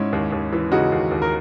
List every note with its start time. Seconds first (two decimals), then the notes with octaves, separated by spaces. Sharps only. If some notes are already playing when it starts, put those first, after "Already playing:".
Already playing: G#2 C#4 E4
0.13 D#2
0.32 D#2
0.53 E3
0.71 C#3 D#4 F#4
0.92 D#2
1.11 D#2
1.22 A#4